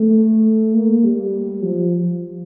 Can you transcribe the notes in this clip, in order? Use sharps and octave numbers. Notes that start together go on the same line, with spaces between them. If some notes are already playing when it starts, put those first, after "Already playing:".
Already playing: A3
A#3
G3
F3